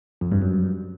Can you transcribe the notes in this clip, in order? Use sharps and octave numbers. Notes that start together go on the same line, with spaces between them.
F2
G2
F#2